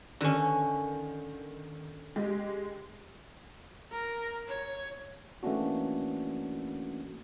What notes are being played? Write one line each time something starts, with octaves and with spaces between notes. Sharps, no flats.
D3 D#3 C#4
G#3 G4
A#4
C#5
E3 A3 A#3 C#4 D4 F#4